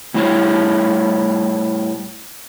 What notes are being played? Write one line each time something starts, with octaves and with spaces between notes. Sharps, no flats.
A2 G3 E4 A#4 C5 C#5